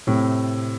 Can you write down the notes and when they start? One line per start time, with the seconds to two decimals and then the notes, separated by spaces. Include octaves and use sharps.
0.07 A2 C3